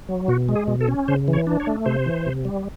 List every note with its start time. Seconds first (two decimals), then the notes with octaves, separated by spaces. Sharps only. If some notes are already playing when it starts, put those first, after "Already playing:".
0.09 F#3
0.28 B2 F#4
0.49 G#3
0.56 G#4
0.68 B2
0.81 A4
0.88 C#4
1.08 C#3 C5
1.28 E3
1.33 C#5
1.47 D4
1.60 C#5
1.67 A3
1.86 C3 C5
2.06 E3
2.26 C3
2.45 G3